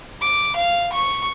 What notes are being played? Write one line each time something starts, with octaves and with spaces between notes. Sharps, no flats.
D6
F5
C#6